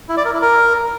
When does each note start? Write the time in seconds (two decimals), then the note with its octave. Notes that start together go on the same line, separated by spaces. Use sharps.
0.09 E4
0.17 D5
0.25 A#4
0.33 E4
0.41 A#4